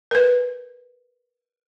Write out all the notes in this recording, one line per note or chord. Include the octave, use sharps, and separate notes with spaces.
A#4 B4